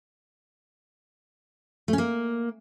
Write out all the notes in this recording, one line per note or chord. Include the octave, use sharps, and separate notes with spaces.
A3
C#4
A#3